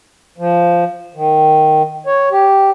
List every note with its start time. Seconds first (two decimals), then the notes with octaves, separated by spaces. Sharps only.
0.38 F3
1.14 D#3
2.06 C#5
2.31 G4